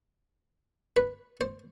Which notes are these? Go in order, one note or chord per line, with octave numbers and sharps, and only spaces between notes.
B4
C5